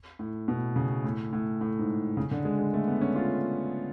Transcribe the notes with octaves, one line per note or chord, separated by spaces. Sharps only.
A2
B2
C#3
A2
A2
A2
G#2
C#3
D3
G#3
G#3
A3
B3
C#4
F4